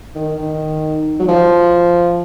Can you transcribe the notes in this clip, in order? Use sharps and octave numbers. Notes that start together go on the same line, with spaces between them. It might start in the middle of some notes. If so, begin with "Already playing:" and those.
D#3
D#3
F#3
F3